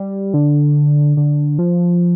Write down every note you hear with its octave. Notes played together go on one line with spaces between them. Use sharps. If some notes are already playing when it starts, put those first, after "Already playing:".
Already playing: G3
D3
D3
F3